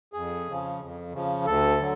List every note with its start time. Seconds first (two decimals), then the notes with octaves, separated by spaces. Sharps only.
0.13 F2 G#4
0.47 C#3 F3
0.80 F2
1.13 C#3 F3
1.46 D2 A4
1.79 D3 F#3